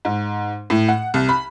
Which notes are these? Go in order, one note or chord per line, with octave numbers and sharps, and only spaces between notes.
G#2
A2
F#5
C2
B5